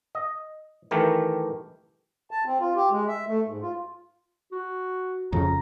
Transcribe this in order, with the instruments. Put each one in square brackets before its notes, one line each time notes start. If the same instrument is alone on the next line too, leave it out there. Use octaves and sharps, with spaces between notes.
[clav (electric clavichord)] D#5
D#3 E3 A3 G4 A#4
[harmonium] A5
C4
F4
G4
G#3
E5
A3
G#2
F4
[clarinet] F#4
[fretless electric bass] F2 C#3 [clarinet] A#5